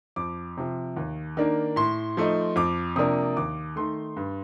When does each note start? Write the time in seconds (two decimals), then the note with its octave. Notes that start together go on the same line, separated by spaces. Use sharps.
0.16 F2 D6
0.57 C3 F3
0.97 D#2
1.37 D#3 A#3 D4
1.76 A2 C6
2.17 F3 A3 D#4
2.56 F2 D6
2.96 C3 F3 A#3 D4 D#6
3.37 D#2 D6
3.76 D#3 A3 C6
4.16 G2